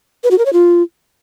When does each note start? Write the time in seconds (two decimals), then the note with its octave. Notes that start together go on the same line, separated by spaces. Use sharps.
0.24 B4
0.31 F#4
0.38 A#4
0.46 C#5
0.53 F4